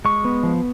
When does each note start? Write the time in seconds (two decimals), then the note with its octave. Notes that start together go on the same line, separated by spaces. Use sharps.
0.05 G#3 C#6
0.25 B3
0.43 F3